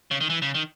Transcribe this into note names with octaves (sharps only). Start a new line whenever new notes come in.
C#3
D#3
E3
C#3
D#3